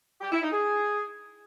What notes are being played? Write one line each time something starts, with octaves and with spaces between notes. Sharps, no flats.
G4
E4
D#4
G#4